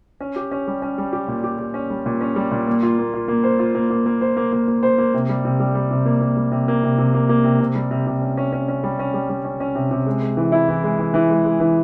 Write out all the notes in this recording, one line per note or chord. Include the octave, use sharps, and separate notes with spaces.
C#4
G4
C#4
G3
C#4
G3
G4
A#2
G4
G4
C#4
G3
A#2
C#4
G3
A#2
A#3
F4
A#3
F4
A#3
C5
F4
A#3
A#3
A#3
C5
A#3
A#3
A#3
C5
A#3
C3
G3
C3
G3
G3
C3
A#3
A#3
G3
C3
A#3
C3
C3
A#3
A#3
C3
C3
G3
C3
C3
C#4
C#4
C#4
C#4
G3
C#4
G3
G3
C#4
C#4
C3
C3
G#3
G#3
E3
E4
E3
G#3
E3
E3
G#3
G#3
E3